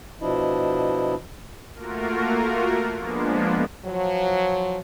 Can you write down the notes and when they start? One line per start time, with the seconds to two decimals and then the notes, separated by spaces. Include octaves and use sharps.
0.22 B2 F3 D4 E4 D#5
1.75 A3 A#3 F4 F#4 A#4
2.97 F3 G#3 A#3 B3 D4
3.85 F3 F#3